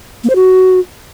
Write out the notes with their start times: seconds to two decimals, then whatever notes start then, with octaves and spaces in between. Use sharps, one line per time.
0.24 A#3
0.30 C5
0.35 F#4